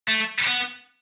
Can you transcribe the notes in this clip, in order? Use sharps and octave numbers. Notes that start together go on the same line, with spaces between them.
A3
B3